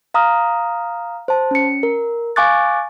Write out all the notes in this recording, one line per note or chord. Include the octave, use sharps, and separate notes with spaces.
F5 A#5 D#6 F6
C5 A5
C#4 C#7
A#4
F5 G#5 C#6 D6 F#6 A6